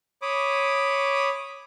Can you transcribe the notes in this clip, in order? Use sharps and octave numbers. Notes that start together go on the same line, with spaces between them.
C#5 B5 D6 D#6